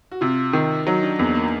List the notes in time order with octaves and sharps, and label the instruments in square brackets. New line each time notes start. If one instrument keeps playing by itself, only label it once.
[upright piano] F#4
[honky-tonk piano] C3 [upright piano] F4
[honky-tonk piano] D#3
[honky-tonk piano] F#3 [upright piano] D#4
[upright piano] D4
[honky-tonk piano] E2 [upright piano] A#3
[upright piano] A#3